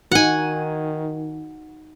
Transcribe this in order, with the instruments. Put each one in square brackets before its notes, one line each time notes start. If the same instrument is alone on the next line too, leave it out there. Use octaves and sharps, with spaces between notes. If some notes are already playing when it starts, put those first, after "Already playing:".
[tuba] D#3 [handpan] D#4 F#4 [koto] F#5 G#5